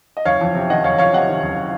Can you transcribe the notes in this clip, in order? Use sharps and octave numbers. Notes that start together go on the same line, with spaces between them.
D#5
F#1 C#5 F5
F2
C3
D#3 D#5 F#5
F#1 C#5 F5
F2 C#5 F5
C3 D#5 F#5
D#3
F#1